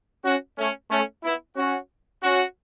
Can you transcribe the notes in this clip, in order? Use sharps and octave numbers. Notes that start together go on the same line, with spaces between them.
C#4 F#4
A3 C#4
A3 C#4
B3 E4
C#4 F#4
C#4 F#4